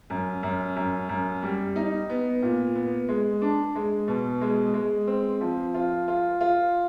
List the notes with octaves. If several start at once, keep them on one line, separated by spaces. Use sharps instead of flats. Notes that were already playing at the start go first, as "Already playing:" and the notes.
F#2
F#2
F#2
F#2
G3
D#4
B3
A#2
B3
G#3
D4
G#3
B2
G#3
G#3
C4
F3
F4
F4
F4